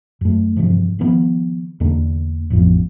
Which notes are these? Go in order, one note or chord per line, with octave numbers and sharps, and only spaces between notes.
F#2 A3
G2 C3 E3 F3
D#3 F3 B3
E2 D3 A#3 D4
A1 F2 F3 B3